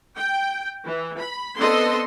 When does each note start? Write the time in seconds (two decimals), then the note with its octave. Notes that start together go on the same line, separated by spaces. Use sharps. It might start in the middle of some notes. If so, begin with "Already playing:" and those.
0.17 G5
0.86 E3
1.20 B5
1.58 B3 C4 D4 A4 D#5 C6